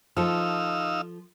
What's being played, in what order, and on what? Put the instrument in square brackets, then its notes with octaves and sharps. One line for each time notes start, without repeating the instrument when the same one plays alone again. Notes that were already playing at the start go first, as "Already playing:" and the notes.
[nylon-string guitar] F3 A4 [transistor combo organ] D#4 F5 E6